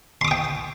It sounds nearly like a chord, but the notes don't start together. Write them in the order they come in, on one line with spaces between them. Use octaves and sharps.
C6 D6 D#6 G5